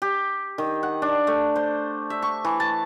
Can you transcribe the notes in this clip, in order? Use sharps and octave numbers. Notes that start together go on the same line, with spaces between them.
G4
D#3
F#5
D4
A3
C5
E5
C#6
E3
A5